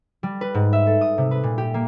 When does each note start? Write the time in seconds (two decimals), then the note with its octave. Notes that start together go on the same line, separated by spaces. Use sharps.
0.23 G3
0.41 B4
0.55 G#2
0.73 E5
0.87 A4
1.01 D#6
1.18 C3
1.31 B4
1.43 A#2
1.58 G4
1.74 A#3